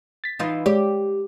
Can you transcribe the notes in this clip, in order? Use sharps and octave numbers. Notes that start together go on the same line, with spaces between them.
A6 B6
E3 D#4 F4
G#3 G4 C#5 D5